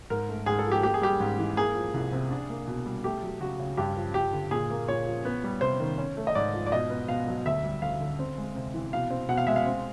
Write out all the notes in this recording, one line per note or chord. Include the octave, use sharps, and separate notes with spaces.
G#2 A#4
A3
G#2 G#4
A4
F3
G4
A#3 G4
G#4
G3 G4
G#2
E3
A#3 G#4
F3
C2
C3
D4
A#3
B2
G3
A3 G4
F#3
C#2 F#4
C#3
G2 G4
F3
G2 G4
D3
A#2 G#4
A#3
A#2 C#5
F3
B3
G3
C3 C5
D#3
C#4
A3
D#5
G#2 D5
F3
D5
B2 D#5
B3
B2 F5
F#3
D2 E5
G3
D2 F5
D3
C4
G#3
C3
E3
B2 F5
C4
B2 F#5
F5
G#3 E5
F5
C4